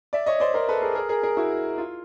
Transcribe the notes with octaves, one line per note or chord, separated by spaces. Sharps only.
D5 E5
C#5 D#5
C5 D5
A#4 C5
A4 B4
G#4 A#4
G#4 A#4
G#4 A#4
G#4 A#4
E4 F#4
F4